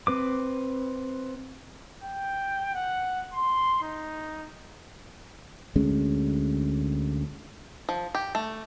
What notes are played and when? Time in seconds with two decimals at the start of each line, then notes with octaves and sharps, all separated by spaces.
0.07 C4 B4 D6
2.03 G5
2.75 F#5
3.34 C6
3.82 D#4
5.76 D2 G#3 C#4
7.89 F3
8.15 G4
8.35 A3